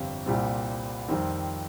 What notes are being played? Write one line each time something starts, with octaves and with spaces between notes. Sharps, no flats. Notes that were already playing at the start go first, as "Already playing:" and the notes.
Already playing: G1 F2 C3 G3
C2 A#2 G3 C4
F2 D#3 G3 C4